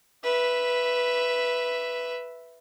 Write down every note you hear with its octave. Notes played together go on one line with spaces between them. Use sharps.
B4 E5